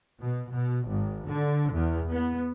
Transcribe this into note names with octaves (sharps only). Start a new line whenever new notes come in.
B2
B2
G#1
D3
E2
B3